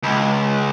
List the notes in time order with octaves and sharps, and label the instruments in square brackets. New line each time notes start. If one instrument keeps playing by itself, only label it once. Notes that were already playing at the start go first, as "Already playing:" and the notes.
[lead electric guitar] C#2